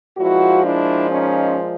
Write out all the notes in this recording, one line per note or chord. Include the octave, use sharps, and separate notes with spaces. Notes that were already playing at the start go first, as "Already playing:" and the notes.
A#2 F3 G#3 E4 F#4
D4 E4
C#4 D#4